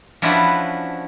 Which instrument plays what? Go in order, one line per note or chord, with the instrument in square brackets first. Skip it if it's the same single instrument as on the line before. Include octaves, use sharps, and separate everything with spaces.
[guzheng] F3 C#4 D4 E4 F#4 B4